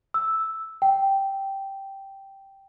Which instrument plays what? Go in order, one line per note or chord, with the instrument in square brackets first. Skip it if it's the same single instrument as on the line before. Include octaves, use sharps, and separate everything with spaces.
[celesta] E6
G5